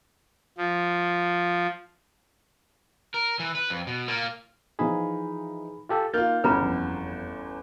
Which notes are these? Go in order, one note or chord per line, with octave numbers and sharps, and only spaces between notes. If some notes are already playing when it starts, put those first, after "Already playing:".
F3
A#4
E3
B4
F2
B2
A#3 F4
E3 F3 D#4 G#4 B5
F4 G4 A4
A#3 D#4 F4 F6 G6 A6
G1 E2 E3 G3 C#4 B4 A#5 B5
F2